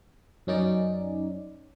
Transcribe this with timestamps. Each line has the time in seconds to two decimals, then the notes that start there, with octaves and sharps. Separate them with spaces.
0.47 F#2 C#4 D#4 D5